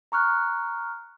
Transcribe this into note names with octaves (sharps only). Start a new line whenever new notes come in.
A#5 C#6 F6 F#6